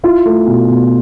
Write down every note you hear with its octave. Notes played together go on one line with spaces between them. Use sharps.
E4 F4
A3
B2
B2